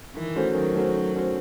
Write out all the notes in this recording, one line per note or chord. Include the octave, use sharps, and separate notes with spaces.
D#3 E3
A3 C#4 F#4 C5
D#3 F#3
A3 C#4 F#4 C5
D#3
A3 C#4 F#4 C5